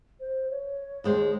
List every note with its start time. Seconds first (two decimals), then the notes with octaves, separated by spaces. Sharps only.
0.20 C5
0.50 C#5
1.04 D#2 G#3 C5